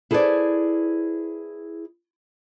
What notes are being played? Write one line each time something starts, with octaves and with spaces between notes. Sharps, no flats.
E4 G#4 A4 B4 C5 D5